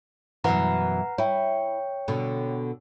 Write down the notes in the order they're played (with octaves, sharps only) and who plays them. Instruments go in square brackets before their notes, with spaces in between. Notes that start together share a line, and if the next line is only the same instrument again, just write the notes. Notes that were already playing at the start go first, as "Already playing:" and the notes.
[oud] F#2 B2 E3 [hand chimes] B4 F#5 A#5
[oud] E4 [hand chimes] C#5 G5
[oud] B2 D3